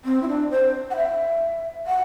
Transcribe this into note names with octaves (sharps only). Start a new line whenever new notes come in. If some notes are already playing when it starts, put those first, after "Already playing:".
C4
E4
D4
C5
F#5
E5
F#5